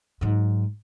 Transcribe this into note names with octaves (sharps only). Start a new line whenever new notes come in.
G#2 F#3